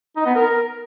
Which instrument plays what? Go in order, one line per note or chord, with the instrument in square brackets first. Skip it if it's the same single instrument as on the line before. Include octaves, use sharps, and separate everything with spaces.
[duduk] D#4
B3
A#4